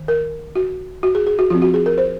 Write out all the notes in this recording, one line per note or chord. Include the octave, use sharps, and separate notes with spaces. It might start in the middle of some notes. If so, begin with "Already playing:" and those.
Already playing: D#3
A#4
F#4
F#4
G#4
G#4
F#4
F3 C4 F4
F#4
G#4
A#4
C5